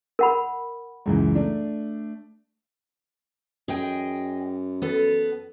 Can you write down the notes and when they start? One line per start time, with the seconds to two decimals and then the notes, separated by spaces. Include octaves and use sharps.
0.19 A#4 F#5 B5
1.06 C#2 F#2 E3
1.35 A3 D4
3.68 F#2 G#4 D#5 G5
4.82 B3 A4